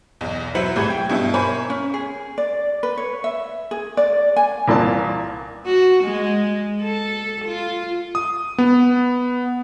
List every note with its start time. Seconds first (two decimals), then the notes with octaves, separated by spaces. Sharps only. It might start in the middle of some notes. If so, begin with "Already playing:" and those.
0.21 B1 E2
0.55 F#3 E4 B4 C5 C#7 F#7
0.76 C2 A2 G#4 B5 G6 G#6
0.90 G5
1.10 G2 B2 E4
1.34 A#4 C5 C#5 G#5 B5
1.70 C#4
1.94 G#4
2.38 D5
2.83 B4
2.97 C#5
3.24 E5
3.71 G#4
3.97 D5
4.36 G#5
4.68 C2 A#2 E3 A5
5.66 F#4
6.04 G#3
6.83 A4
7.45 F4
8.15 D#6
8.58 B3